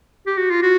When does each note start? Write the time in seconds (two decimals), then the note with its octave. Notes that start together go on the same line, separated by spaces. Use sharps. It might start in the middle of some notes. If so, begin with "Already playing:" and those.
0.26 G4
0.38 F#4
0.50 F4
0.63 F#4